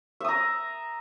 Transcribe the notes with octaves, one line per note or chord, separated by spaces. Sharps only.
E5 A#5 D#6